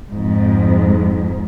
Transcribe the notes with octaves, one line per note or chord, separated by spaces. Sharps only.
F2 G#2